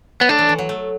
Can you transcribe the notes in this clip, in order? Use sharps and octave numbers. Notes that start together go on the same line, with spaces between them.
F#3 B3
A3 D4
E3
E3
F#3
A3